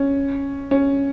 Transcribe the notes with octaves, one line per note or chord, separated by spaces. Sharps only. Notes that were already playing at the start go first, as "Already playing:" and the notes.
Already playing: C#4
C#4